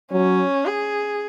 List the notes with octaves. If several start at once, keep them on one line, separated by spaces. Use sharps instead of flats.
F#3 C#4
G#4